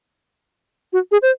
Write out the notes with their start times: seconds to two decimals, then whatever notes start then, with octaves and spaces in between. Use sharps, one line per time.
0.93 F#4
1.12 G#4
1.22 C5